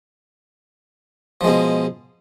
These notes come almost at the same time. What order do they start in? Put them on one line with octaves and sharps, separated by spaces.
F3 G#3 B2